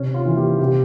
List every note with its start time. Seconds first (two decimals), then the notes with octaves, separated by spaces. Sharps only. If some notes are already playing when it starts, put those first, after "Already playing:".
Already playing: C3 C#4
0.14 F4
0.26 E3 A#3
0.37 G4
0.59 C3 G4